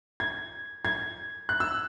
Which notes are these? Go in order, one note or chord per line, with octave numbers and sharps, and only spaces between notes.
G#6
G#6
F#6
E6